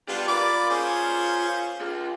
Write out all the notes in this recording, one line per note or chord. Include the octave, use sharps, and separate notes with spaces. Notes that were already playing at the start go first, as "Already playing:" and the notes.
B3 D4 F4 G4 D5
F4 A#4 D5 B5 D6
C#4 G#4 C5
F4 G#4